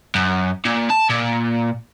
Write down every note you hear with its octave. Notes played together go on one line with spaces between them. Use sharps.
F#2
A#2
A5
A#2